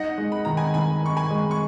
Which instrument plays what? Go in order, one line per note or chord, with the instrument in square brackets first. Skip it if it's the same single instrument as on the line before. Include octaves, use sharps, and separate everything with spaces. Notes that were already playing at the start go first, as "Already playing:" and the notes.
Already playing: [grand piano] D#4 [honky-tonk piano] D#5 F#5
[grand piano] G#3
[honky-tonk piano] B5
[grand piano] D#3 [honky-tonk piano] A#5
[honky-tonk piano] G#5 B5
[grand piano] D#3 [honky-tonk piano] G#5 B5
[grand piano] D#4 [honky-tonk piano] C#6
[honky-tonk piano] G#5 B5
[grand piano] G#3
[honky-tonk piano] C#6